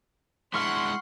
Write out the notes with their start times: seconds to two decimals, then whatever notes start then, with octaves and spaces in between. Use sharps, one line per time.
0.54 G#3 D4 E4 F#5 C6 C#6 F6